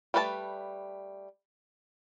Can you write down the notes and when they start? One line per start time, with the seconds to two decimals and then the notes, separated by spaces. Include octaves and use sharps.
0.14 G3 A3 B4 D5 A5